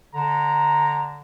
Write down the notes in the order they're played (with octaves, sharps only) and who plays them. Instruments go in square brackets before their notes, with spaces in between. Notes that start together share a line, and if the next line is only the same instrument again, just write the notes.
[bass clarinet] D3 [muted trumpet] A#5